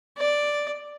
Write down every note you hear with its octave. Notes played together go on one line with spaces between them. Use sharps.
D5